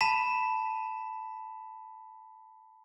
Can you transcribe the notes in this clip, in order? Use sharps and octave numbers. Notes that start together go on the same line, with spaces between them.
A5 B5 B6 E7